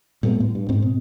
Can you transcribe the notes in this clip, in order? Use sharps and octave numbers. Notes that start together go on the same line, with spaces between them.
A#2 G3 A3 B3
A2
G2
G#2 C4
B2